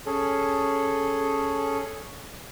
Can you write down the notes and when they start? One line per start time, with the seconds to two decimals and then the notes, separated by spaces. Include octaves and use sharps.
0.06 C#4 G#4 A4